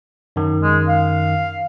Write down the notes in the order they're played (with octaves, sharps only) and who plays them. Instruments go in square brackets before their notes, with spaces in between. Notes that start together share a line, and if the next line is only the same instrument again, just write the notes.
[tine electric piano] F#2 D#3
[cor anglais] G#3
F5